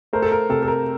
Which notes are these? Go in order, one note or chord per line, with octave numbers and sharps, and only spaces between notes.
A3 A#4 C5
A4
A#4
C3 A4
A4
A#4